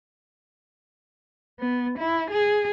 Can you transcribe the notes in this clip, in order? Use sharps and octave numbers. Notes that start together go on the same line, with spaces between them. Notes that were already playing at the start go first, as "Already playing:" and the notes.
B3
E4
G#4